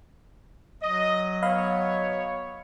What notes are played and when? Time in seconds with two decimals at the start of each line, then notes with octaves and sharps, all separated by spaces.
0.82 F#3 D#5
1.42 B3 C#5 D#5 F5 B5